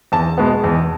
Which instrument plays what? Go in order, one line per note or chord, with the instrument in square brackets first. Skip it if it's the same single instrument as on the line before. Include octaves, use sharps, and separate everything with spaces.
[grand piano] E2 [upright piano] A5
[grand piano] B2 G#3 B3
E2